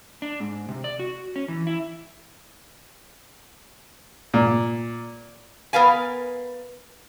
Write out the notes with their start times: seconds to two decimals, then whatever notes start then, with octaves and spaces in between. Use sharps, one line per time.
0.22 D4
0.40 G#2
0.69 C3
0.84 D5
1.00 F#4
1.36 C#4
1.48 E3
1.67 E4
4.34 A#2
5.73 B3 A#4 B4 F5 G#5